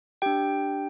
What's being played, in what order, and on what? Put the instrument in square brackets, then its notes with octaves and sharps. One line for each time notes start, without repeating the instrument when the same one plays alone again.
[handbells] D4 G4 G5